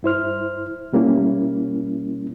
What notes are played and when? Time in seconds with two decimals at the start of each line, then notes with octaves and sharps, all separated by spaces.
0.03 G2 E4 C5 F6
0.93 B2 G3 A#3 C#4 E4